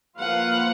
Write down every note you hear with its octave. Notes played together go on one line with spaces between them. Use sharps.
F3 A#3 F4 B4 F5 F#5